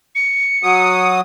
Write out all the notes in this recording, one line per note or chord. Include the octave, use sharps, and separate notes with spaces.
C#7
F#3 D#6